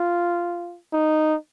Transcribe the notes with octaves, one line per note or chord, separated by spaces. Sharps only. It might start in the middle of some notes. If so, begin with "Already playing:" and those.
Already playing: F4
D#4